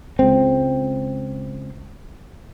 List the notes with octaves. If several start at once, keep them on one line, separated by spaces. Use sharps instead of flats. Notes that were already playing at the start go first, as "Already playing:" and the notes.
C#2 G#3 C4